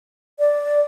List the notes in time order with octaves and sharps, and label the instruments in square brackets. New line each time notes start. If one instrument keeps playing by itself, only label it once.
[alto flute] D5